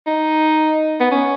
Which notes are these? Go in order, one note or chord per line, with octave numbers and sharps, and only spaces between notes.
D#4
B3
C#4